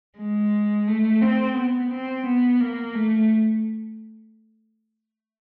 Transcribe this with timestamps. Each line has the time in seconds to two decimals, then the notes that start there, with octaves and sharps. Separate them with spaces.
0.18 G#3
0.88 A3
1.22 C4
1.56 B3
1.92 C4
2.26 B3
2.60 A#3
2.95 A3